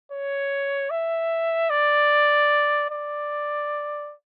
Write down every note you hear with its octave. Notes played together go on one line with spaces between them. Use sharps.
C#5
E5
D5
D5